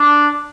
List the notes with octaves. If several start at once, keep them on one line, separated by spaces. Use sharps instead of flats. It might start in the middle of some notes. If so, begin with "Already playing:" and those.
Already playing: D4